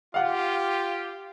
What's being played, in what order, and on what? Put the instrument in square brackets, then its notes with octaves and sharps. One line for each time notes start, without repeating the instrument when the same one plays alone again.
[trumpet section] F4 G4 [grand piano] F5 F#5